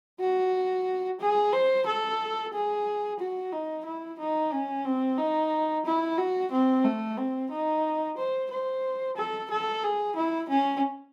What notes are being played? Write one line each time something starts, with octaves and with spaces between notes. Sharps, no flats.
F#4
G#4
C5
A4
G#4
F#4
D#4
E4
D#4
C#4
C4
D#4
E4
F#4
C4
A3
C4
D#4
C5
C5
A4
A4
G#4
E4
C#4